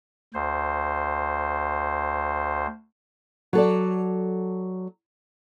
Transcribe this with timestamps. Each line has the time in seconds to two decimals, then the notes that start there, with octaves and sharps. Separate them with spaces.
0.34 D2 C5
3.53 F#3 A4 D5